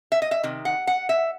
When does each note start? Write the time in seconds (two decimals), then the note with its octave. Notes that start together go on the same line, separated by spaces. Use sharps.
0.12 E5
0.22 D#5
0.31 E5
0.43 C3 D#3
0.65 F#5
0.87 F#5
1.09 E5